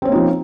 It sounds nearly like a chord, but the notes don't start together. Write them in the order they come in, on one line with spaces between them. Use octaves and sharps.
C4 C#4 A#3 D#4 F3